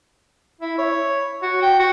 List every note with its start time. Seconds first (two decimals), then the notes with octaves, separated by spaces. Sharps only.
0.61 E4
0.79 C#5
1.43 F#4
1.62 G5
1.79 F#4